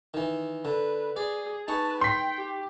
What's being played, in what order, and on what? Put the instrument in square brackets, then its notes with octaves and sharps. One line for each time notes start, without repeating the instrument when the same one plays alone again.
[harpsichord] D#3 E3
[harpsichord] D3 [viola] B4
[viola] G#4 [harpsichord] D5
[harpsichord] D#4 G#4 C#6 [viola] B4 A5
[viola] G5 [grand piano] C6 B6
[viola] G4